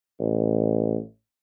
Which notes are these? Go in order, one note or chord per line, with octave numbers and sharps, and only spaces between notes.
A1